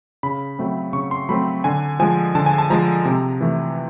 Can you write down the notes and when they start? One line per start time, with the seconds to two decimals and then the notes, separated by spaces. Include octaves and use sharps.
0.23 C#3 B5
0.59 F#3 A3 C4
0.93 C#3 C#6
1.11 C6
1.29 F#3 A3 C4 B5
1.64 D3 G#5
2.00 F3 G#3 G#5
2.35 D3 A5
2.46 G#5
2.58 A5
2.70 F3 G#3 A#5
3.05 C3
3.41 E3 A3